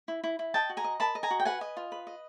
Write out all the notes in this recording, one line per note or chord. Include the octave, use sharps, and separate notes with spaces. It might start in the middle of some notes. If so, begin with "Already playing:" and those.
E4
E4
E4
D#5 G5 A5
F#4
G#5 A#5
D#5
A#4 A5 B5
D#5
G#5 A#5
F#4
G5
B4 F#5 G#5
D#5
F4
B4
D#5